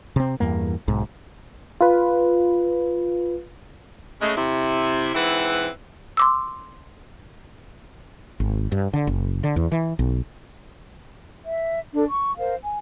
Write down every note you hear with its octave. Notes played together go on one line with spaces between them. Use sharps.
C3 C4
E2 G2 A#3
B1 G#2
F4 B4
C#3 G#3 A3
C3 E4
G#2 E3 C4 E4 B4 F#5
C6 D6 E6
G#1
G2
D3
F#1
D3
E2
E3
B1
E5
D4 A4
C#6
A#4 C5 F5
G#5